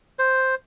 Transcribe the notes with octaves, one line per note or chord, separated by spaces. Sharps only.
C5